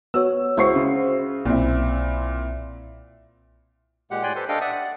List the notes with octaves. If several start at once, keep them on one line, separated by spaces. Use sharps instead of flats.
B3 F#4 C#5 E6
C#2 E4 F#4 C5 C#6 C7
C#3
B1 A#2 C4 E4
A#2 G#3 G4 F#5
A2 D5 G5 G#5 C6 F#6
G4 A4 B4 C5 C6
D4 A4 D#5 F5 G5
D5 E5 F#5 D#6
D5 F#5